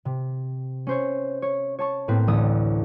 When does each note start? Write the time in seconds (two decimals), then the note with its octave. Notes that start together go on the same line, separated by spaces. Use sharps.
0.05 C3
0.87 C#4 C5 C#5
1.42 C#5
1.79 C#5 A5 C#6
2.08 A2 A#3 C4 B4
2.27 A1 D2 A3 D#6 E6